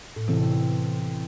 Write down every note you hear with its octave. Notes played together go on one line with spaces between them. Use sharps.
A2
C3 E3 C4 A4